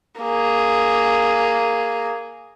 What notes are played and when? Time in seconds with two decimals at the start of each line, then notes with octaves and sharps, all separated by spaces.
0.21 A#3 G#4